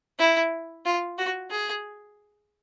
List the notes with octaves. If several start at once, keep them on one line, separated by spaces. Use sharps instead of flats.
E4
F4
F#4
G#4